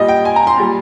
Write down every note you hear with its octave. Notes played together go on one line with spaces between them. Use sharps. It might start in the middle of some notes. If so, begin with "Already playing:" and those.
Already playing: A#2 G3 D#5
G5
G#5
A#5
C6
A#2 G3